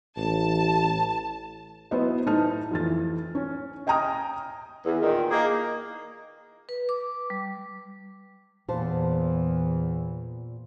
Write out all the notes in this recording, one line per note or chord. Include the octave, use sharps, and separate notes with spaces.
A1 A5
F#3 B3 E4 B4 C5 D#5
A2 D#4 A5 F6
F2 E3 A6
C#4
D#5 G5 G#5 A#5 D#6 F6
E2
A#2 D#3
A#3 D#4 G#4
B4
D6
G3
E2 A#2 E3 C5 A5